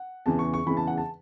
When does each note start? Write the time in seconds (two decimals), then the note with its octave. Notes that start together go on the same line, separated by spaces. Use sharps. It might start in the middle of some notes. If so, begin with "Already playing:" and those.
Already playing: F#5
0.26 E2 C#3 E3 A5
0.39 C#6
0.54 C#6
0.66 E2 C#3 E3 B5
0.77 A5
0.87 F#5
0.98 A5